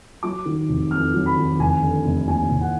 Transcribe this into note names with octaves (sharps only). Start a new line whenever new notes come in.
F#3 D6
D#3
F1
F2 F6
F#3
B5
D#3
F1 G#5
D3
F1
D#2 G#5
F1
F#5